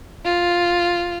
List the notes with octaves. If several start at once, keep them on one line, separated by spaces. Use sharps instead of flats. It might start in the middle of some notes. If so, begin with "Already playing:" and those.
F4